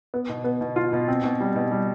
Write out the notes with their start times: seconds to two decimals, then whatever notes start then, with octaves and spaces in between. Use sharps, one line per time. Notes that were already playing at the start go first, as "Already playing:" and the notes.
0.14 B3
0.29 B2
0.44 B3
0.61 B2
0.76 F4
0.93 B2
1.08 C4
1.24 B2
1.40 G3
1.56 B2
1.72 G3